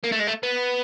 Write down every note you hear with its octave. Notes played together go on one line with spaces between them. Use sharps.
A#3
A3
G#3
A3
B3